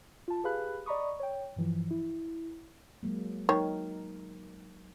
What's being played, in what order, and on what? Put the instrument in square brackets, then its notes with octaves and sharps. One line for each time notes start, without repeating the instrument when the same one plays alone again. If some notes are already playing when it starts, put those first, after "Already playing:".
[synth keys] F4 A5
G4 G#4 B4 F5 B5 F#6
D5 D#5 A#5 B5 C#6 D#6
C#5 G5
G2 E3 F3
E4
[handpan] F#3 G#3 A#3
[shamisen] D#3 C#5 [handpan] F#3 D#4 A#4